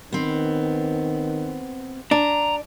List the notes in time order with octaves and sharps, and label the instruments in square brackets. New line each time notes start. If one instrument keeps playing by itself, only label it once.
[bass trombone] D#3 [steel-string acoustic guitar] B3 C4
[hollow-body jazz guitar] D4 [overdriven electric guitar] A#5